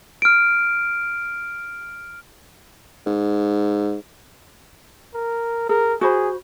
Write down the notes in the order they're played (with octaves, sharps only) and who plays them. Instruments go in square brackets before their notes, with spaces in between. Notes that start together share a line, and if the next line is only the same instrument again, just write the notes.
[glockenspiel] F6 D7
[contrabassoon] G#2
[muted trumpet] A#4
[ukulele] G#4 [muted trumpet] A#4
[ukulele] F#4 C5 B5 [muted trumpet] G#4